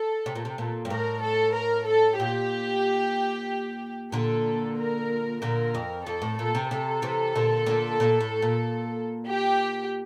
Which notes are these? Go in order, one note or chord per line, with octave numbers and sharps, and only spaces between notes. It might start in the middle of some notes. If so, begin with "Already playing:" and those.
Already playing: A4
C3
A#2
C3
A#2
G2
A2 A#4
A4
A#4
A4
A#2 G4
A#2 D3 A4
A#4
A#2 D3 A#4
F2
F2 A4
A2
A#2 A4
C3
C3 A4
C3 E3
A#2 D3
A#2 D3
A#2
A2
A#2
G4